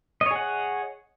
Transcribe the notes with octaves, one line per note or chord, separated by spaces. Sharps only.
G#4 C#5 D#5 F#5